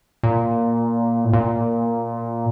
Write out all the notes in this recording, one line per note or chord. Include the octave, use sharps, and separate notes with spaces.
A#2
A2
A#2